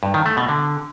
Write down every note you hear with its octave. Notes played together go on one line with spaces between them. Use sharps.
G2
D#3
A3
B2
D3